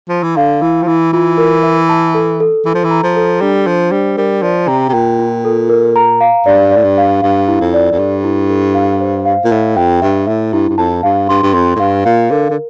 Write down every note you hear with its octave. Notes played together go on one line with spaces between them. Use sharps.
F3
E3
D3 F5
E3 E4
F3
E3 E4
E3 F4
A#4
E5
A5
A4
A4
E3 A4
F3
E3
A#5
F3
A4
G3 D4
F3 C5
G3 D4
G3 A#4
F3 D5
C3 A#5
C3
A#2 G5
F4
A4
A#4
A#5
F5
G2 D5
A2 D5
G2
F5
G2 F5
E4
F2
D5
F2
G2 A4
E4
A4
F5
C5
F5
A#2
A2 E5
F2 G5
G2 E5
A2 E5
G2 E4
G2
F2 A5
G2 F5
G2 C6
G2
F2 C6
A2
G2 F5
A#2 F5
D3 A#4
D3